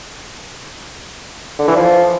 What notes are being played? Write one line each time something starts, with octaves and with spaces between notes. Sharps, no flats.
D3
E3
F3